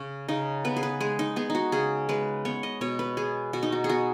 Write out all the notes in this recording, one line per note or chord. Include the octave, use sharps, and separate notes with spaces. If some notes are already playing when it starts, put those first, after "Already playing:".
Already playing: C#3 C#4
C#3 D#4
B3 B4
G#4
B4
G#3 G#4
D#4
B3 G#4
D#4 F#4
C#3 G#4
G#3 B4
B3 C#5
D#5
B2 C#5
B4
B3 G#4
B2 F#4
D#4
F#4
G#4
B3 F#4